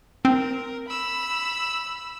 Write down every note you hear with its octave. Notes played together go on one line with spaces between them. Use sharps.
C4 A#4
B5 E6